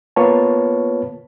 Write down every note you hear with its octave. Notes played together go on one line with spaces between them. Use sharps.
A#3 B3 F4 B4 C#5 A5